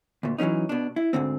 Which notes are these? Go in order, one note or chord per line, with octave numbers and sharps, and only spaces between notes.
D2 A#2
E3 F#3 A#3 C#4 D#4
B2 D4
E4
D2 G#2 D3 C4